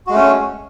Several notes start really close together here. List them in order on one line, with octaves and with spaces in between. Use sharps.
F#4 G#3 A3 C#4